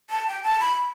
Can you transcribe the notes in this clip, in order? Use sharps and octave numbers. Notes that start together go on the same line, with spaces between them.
A5
G5
A5
B5